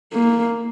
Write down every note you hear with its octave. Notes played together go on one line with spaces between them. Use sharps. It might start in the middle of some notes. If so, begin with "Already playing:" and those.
A#3